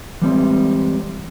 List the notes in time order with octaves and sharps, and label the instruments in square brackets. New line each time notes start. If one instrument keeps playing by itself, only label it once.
[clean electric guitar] E3 G3 G#3 C4